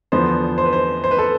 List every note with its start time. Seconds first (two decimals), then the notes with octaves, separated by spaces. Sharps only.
0.12 E2 D3 F3 B3 C5
0.58 C5
0.65 B4
0.73 C5
1.04 C5
1.11 B4
1.18 A4